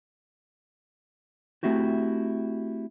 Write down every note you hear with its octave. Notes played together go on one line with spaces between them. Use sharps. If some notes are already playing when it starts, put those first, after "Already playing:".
A3 C4 E4 F#4 G4